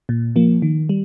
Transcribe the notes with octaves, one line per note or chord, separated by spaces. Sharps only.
A#2
F3 A#3
D#3
G3